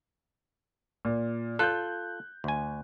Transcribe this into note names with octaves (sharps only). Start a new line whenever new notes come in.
A#2
F4 A4 F#6 G6
D2 G#5